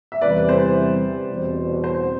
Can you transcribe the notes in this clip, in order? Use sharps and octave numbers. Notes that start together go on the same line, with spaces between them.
E5
E2 C3 E3 G3 B4 D5
B4
C5
E2 B2 G3 C4
C5